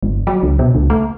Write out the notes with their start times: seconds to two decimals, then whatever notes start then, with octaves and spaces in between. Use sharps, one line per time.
0.03 G1
0.27 F#3
0.43 C#2
0.59 B2
0.75 C#2
0.90 A3